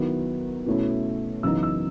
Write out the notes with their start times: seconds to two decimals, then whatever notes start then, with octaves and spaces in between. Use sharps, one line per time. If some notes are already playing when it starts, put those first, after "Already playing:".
Already playing: D#3 F#3 B3 E4
0.66 B2 A3 C#4 E4
1.43 F#2 C#3 E3 B3 D#4 E6
1.63 E6